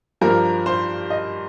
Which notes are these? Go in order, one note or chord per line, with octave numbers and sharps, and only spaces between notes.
G2 F3 A#3 A#4
C5
D#5